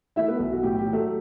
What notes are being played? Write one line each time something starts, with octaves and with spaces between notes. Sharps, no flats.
A3 E4 E5
B3 B4
B1
F#4
A2 G4
G4
F#3
A3 A4